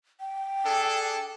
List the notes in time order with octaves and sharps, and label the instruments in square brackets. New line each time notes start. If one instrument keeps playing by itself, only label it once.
[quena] G5
[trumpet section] D4 G#4 A4